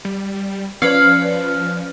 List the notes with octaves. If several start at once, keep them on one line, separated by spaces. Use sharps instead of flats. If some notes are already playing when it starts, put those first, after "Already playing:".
G3
F3 C#4 B4 D5 F5